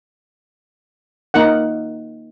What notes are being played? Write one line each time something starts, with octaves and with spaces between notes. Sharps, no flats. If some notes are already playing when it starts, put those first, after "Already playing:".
A#3 D#4 A#4 F#5